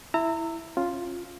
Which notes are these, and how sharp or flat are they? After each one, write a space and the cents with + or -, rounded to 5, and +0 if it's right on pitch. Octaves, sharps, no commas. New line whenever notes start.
E4 +0 A#5 -30 E6 +0
C#4 -20 F4 +0